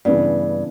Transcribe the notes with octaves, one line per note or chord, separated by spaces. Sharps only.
G2 C#3 E3 B3 D4